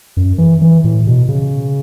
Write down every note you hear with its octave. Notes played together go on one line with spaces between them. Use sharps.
F#2
E3
E3
A2
B2
C#3